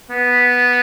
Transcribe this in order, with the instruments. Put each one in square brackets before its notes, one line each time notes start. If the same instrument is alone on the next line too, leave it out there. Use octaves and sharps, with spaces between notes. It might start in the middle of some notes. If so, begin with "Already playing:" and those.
[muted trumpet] B3